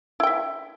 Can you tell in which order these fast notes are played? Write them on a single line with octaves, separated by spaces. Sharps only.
E4 G5 E5